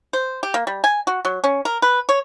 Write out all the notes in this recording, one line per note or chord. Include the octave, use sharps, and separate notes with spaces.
C5
G4
A#3
G3
G#5
F#4
F#3
C#4
A#4
B4
C#5